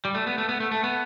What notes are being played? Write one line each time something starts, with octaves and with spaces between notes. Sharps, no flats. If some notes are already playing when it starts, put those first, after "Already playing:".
G3
A3
B3
A3
B3
A3
A3
B3